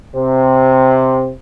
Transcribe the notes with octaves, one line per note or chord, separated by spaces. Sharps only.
C3